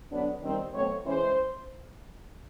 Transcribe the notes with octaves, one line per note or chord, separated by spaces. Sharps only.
D3 F#3 B3 D4
D#3 G3 C4
B2 F#3 A3 C4 C#5
E3 G#3 C#4 C5